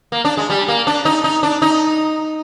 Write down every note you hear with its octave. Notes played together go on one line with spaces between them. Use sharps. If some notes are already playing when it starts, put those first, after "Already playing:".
A#3
D4
G#3
G3
A#3
D4
D#4
D#4
D4
D#4